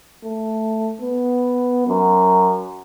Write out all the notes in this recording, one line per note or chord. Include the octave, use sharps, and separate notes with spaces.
A3
B3
F#2